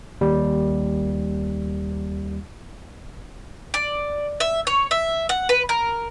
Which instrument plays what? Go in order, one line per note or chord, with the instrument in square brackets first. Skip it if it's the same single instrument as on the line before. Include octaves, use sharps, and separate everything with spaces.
[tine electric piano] D#2 G3
[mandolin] D5
E5
C#5
E5
F#5
B4
A#4